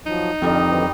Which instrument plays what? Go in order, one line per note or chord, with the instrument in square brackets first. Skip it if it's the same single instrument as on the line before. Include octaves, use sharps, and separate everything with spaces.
[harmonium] F3 F#3 [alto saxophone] D#4
[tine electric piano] F2 [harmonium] D3 [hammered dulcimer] D#3 G3 D#5
[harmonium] D3 E3 F#3